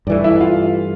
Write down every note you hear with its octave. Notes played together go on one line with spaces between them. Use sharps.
G2 E3 A3 D5
E4 E5
F4 F5